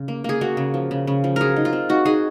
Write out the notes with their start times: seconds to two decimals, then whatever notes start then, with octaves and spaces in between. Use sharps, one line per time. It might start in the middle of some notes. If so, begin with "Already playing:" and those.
Already playing: C#3
0.08 A#3
0.24 A#3 G#4
0.41 A#3 F#4
0.57 C#3
0.74 F3
0.91 C#3
1.07 C#3
1.24 F3
1.36 F#3 G#4 A#4
1.56 D#4
1.65 F4
1.73 C4
1.89 D#4 F#4
2.06 D#4 G#4